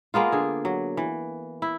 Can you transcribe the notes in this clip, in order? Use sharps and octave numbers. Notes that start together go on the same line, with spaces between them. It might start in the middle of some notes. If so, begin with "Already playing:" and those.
G#3 A#3 B3 F4
D3 G#4
F#3
E3
E4